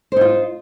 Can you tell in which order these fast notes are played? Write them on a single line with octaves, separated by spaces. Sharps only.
C5 D#4 F4